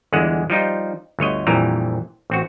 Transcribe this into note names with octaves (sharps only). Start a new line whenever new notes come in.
G1 E2 D3 G#3 F#5
F3 G3 D#4 F4
G1 D2 C#5 D#5
A#1 F2 A#2 E3 G3 A#5
A1 C4 F#4